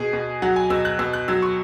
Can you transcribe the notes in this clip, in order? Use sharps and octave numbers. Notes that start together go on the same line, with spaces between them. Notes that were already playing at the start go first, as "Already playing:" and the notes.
Already playing: B2 G#4
B2
F#3 F#5
G#5
B2 E6
F#6
B2 E6
F#6
F#3 E6
C#6